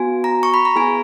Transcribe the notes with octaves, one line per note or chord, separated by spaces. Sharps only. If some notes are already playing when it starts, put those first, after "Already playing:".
Already playing: B3 F#4 G#5
A#5
C#6
B5
A#5
B3 E4 G#4 G#5